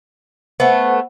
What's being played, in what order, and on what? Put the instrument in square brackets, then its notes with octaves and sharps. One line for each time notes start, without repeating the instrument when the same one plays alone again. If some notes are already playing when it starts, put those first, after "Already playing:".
[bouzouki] A3 B3 [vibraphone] C5 F#5